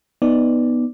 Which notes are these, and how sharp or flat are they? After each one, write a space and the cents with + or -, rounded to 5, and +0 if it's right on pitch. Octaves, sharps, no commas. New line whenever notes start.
B3 +0 D#4 +0 D5 +0